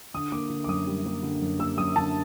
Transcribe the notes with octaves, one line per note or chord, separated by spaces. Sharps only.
D3 D#6
A#3 D6
D3
D6
F#2 D#6
G3
A#3
D3
F#2
A#3 E6
F#2 D#6
D3 A5